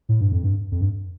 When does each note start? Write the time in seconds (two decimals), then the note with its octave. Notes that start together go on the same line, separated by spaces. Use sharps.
0.09 A2
0.21 G2
0.32 F2
0.44 G2
0.72 F2
0.81 G2